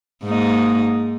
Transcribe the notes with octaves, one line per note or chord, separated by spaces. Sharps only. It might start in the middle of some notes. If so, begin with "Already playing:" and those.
G#2 A#3 D#4